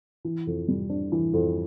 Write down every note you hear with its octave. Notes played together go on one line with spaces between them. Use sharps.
E3
F2
G3
D4
E3
F2